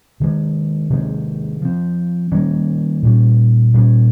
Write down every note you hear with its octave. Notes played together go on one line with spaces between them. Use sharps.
C3 D#3 G#3
C3 D#3 G#3 C4
F3 C4
D#3 G3 A#3 C#4
A#2 G3 C#4
A#2 G3 C#4